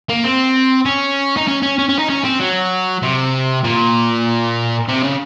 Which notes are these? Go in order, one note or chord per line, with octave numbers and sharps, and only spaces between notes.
A#3
C4
C#4
D#4
C#4
C#4
C#4
C#4
D#4
C#4
C4
F#3
C3
A#2
C3
C#3